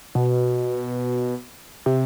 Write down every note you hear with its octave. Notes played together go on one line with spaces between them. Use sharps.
B2
C3